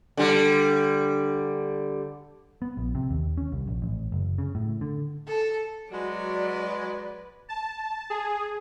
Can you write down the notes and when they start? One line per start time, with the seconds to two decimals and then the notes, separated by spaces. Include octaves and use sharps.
0.17 D3 G3
2.62 B3
2.77 A#1
2.95 C3
3.11 D#2
3.37 C#4
3.52 C2
3.68 A#1
3.82 A1
4.12 F#1
4.38 C#3
4.55 A2
4.81 D3
5.27 A4
5.92 F#3 G#3 F#4 B4 D5
7.49 A5
8.10 G#4